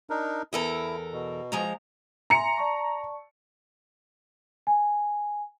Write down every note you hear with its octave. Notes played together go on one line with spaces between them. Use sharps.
D4 D#4 A#4
E2 E4 A4 A#4
B2
F3 G#3 A#5
E5 G#5 A#5 C6 C#7
D5 A5 C#6
G#5